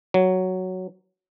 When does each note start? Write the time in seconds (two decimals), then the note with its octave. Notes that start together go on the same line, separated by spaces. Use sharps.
0.14 F#3